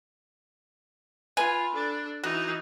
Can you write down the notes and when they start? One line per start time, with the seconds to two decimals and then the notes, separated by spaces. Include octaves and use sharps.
1.37 F4 B4 G#5
1.72 D4 A4
2.23 E3 D#4 F#4